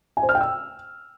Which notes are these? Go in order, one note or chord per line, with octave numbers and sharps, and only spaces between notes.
G#5
C5
F6
G5
E6